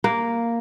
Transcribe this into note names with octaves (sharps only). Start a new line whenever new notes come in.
A#3